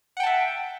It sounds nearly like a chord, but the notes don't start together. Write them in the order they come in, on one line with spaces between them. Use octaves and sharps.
F#5 G5 A5 E5